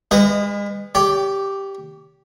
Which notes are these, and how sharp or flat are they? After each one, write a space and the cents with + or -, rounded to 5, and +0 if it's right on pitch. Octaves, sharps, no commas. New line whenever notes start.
G#3 -35 B4 +20 D#5 -20
G4 +0 C#5 +45